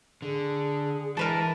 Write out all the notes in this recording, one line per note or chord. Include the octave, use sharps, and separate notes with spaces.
D3 G#4
E3 G#3 A#4 B4 A5